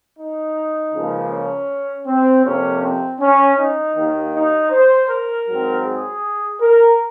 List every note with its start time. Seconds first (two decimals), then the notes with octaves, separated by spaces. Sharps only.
0.18 D#4
0.94 C#2 C#3 F3 A#3
1.31 C#4
2.07 C4
2.44 F2 C3 F3 A#3 C#4
2.82 C4
3.20 C#4
3.57 D#4
3.96 D#2 D#3 A#3
4.33 D#4
4.71 C5
5.09 A#4
5.47 G#2 F#3 C4
5.84 G#4
6.60 A#4